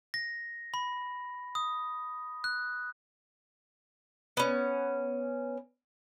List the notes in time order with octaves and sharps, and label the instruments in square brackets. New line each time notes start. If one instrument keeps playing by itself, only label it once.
[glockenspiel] A#6
B5
D#6
F#6
[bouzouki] B3 C#4